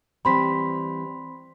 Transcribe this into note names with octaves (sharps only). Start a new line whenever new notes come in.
E3 G3 C4 B5 C6 B6